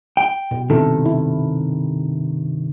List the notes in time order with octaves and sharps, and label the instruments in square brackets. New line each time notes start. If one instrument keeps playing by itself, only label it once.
[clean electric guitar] G5
[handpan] B2
[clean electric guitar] G2 C3 D#3 [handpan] E4 A4
[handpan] E4